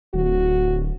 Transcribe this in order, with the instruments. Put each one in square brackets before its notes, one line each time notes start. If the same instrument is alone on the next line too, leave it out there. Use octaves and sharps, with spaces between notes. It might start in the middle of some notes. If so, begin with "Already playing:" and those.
[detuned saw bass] D1 [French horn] F#4